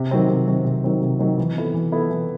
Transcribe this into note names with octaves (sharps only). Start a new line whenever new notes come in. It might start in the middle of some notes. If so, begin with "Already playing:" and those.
Already playing: C3
D#3 F#3 C4
C3
D#3 F#3 C4
C3
D#3 F#3 C4
C3
D#3 F#3 C4
E3
B3 E4 A4
E3
B3 E4 A4
E3